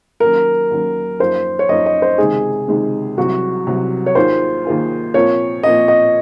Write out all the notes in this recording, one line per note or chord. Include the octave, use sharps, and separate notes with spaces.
D#2 D#3 F#3 C#4 A#4
D#2 D#3 F#3 C#4
F#2 F3 A#3 D#4 A#4 C5
C#5
F#2 F3 A#3 D#4 A#4 D#5
D#5
C5
C#2 C3 D#3 G#3 D#4 G#4
C#2 C3 D#3 G#3 D#4
C2 C3 F#3 F#4
C2 C3 F#3
C#5
D#2 D#3 A#3 F4 G#4 C5
D#2 D#3 A#3 F4 G#4
A#2 F3 C4 F4 A#4 C#5
A#2 F3 C4 F4 A#4 D#5
D#5